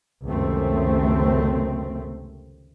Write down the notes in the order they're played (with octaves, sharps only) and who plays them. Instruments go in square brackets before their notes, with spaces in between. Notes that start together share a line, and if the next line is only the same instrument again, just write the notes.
[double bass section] C#2 F#2 C3 D#3 A3 C4